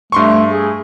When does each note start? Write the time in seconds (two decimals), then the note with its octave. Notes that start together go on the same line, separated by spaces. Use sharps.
0.12 G2 A3 C6 C#6
0.49 G#4